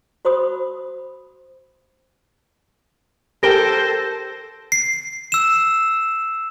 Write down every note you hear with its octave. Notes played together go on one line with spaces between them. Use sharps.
F#4 C5 B5 D#6
G4 A4 A#4 C5 G5 A#6 D7 G7
C7
E6 E7